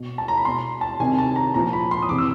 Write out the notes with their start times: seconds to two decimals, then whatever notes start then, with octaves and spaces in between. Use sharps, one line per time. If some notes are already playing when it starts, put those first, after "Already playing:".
Already playing: B2
0.18 A5
0.28 A#5
0.37 B5
0.45 B2 C6
0.81 A5
1.00 C3 D#3 G#5
1.18 A5
1.36 A#5
1.54 A#2 F3 A#5
1.73 B5
1.91 C6
2.02 D#6
2.09 C3 E3 D6
2.18 E6